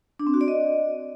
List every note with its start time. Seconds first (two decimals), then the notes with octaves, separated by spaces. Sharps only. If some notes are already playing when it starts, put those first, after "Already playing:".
0.19 D4
0.27 C4
0.34 F#4
0.41 D5
0.48 D#5